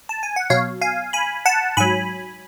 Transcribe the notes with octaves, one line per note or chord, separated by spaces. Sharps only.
A5
G#5
F#5
B2 F#3 C#5 F5
F5 G#5
G#5 B5
F#5 A5
G#2 F#3 G#5 B5